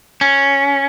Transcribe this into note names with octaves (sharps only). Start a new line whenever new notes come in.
C#4